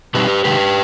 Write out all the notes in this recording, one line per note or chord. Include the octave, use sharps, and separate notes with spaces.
B2 G3 C4 D#4 G4 B4
C3 D#3 G#3 G4 B4